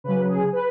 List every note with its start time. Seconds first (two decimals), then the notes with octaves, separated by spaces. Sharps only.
0.04 C#3 F#3 B4
0.28 G#4
0.53 B4